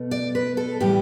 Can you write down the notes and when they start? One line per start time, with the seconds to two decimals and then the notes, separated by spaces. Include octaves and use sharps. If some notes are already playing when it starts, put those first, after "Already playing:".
Already playing: B2 A3
0.11 D5
0.35 B4
0.57 A4
0.80 A2 E3 G3 G4